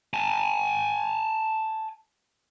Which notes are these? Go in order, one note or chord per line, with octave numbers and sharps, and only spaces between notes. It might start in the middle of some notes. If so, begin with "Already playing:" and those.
G#5 A5